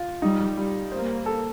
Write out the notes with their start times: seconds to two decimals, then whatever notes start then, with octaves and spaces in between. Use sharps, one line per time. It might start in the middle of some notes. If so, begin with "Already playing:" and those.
Already playing: F4
0.22 G3 D#4
0.57 G3
0.92 A#3 C5
1.26 A4